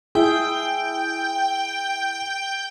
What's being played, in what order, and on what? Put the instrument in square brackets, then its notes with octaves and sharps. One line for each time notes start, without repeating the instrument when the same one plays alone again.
[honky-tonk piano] E4 [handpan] G#4 [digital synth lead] G5